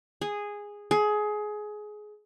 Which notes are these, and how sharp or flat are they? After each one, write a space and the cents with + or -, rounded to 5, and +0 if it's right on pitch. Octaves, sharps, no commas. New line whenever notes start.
G#4 -10
G#4 +20